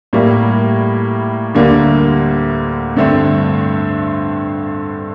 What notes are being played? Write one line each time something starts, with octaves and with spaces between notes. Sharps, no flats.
A2 G3 A#3
D2 D3 G3 A#3
G2 D3 A3 C4